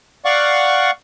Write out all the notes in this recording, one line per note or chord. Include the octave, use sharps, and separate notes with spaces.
D5 F5 F#5 C#6